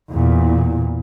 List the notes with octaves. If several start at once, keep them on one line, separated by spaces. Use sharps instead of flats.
E2 A#2